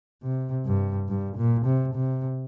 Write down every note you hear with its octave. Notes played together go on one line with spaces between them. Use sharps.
C3
G2
G2
A#2
C3
C3